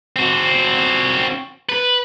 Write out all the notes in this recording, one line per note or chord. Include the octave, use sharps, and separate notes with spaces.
C4 F#4
B4